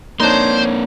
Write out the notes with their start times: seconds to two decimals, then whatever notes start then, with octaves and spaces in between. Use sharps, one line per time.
0.20 A#3 C4 D4 D#4 C5 C#5 C6